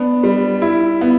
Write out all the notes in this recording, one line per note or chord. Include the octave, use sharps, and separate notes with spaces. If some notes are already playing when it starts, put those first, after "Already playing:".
Already playing: B3 D4
G3
E4
B3